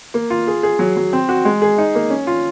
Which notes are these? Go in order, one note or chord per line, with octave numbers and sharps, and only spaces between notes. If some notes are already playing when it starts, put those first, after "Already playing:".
A#3
F4
G#4
G#4
F#3
F#3
C4
F#4
G#3
G#4
D#4
A#3
C#4
F4